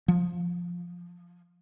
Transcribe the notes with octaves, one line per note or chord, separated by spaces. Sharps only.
F3